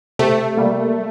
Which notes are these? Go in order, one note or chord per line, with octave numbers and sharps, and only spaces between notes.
C3 A3
G3 A#3